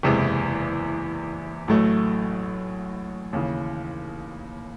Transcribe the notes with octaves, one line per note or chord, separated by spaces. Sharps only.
F#1 E2 C3 E3 G#3
A1 A2 F#3 A3
D#2 C#3 E3